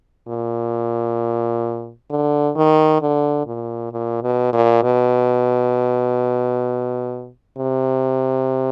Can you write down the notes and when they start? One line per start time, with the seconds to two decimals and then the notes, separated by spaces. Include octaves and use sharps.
0.28 A#2
2.10 D3
2.56 D#3
3.02 D3
3.47 A#2
3.93 A#2
4.23 B2
4.53 A#2
4.83 B2
7.58 C3